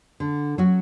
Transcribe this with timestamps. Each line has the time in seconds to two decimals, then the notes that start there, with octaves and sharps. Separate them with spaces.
0.20 D3
0.58 F#3 C#4 F#4